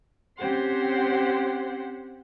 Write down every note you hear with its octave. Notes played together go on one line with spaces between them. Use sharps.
C4 C#4 G4 C5 F#5 C6